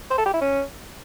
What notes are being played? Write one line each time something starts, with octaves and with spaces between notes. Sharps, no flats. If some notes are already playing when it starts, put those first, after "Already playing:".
C5
A4
G4
E4
C#4